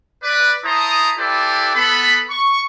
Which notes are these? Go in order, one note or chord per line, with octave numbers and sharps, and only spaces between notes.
B4 D5
E4 C5 A5 A#5 D#6
E4 G4 A4 B4 C5 D5
B3 A4 B5
C#6